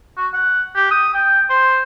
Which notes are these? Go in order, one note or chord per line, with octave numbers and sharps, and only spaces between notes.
F#4
F#5
G4
D#6
G5
C5